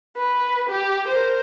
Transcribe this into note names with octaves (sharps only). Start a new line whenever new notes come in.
B4
G4
A#4 C5